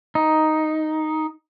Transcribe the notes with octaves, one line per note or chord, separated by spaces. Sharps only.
D#4